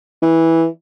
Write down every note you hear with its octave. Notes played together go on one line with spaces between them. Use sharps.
E3